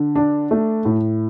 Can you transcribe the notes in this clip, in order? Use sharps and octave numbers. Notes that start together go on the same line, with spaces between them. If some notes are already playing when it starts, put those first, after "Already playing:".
Already playing: D3
D4
A3
A2